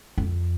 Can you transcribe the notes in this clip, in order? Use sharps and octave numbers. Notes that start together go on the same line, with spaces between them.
F2